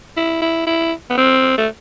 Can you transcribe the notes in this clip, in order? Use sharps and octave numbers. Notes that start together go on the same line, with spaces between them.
E4
E4
E4
B3
C4
A3